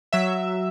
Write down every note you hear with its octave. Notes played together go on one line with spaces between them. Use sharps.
F#3 E5